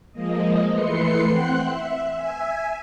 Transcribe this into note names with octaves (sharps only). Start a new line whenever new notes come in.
F3 G#3 A#3 D#5
E3 A3 B4 C6 C7 C#7
C4 F#5 G5 C6 F#6
E5
E5 G#5